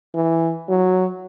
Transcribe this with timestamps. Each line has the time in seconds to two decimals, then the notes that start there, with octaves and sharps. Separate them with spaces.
0.15 E3
0.69 F#3